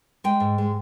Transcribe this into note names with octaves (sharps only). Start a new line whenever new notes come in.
G#3 G5
G#2
G#3